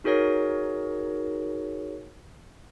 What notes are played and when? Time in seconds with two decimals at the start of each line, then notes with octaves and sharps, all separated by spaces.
0.04 D#4 F#4 G#4 A#4 C#5 A#6